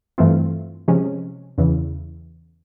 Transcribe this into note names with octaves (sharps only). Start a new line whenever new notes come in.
G2 E3 A3 C4 F4
C3 F3 G#3 C#4
E2 C#3 E3